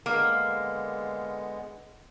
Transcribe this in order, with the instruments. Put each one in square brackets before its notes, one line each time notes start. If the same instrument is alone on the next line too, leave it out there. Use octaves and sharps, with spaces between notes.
[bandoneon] D3 G#3 B3 [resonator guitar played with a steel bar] A#3